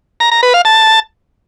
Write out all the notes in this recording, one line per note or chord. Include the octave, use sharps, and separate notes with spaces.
A#5
A#5
B4
F5
A5